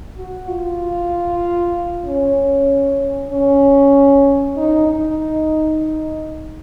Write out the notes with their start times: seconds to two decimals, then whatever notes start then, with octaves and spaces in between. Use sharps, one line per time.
0.18 F#4
0.49 F4
2.06 C#4
3.31 C#4
4.57 D#4
4.88 D#4